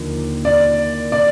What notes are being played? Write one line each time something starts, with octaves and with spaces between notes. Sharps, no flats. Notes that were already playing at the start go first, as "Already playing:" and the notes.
Already playing: D#2 D3 F3
D5
D5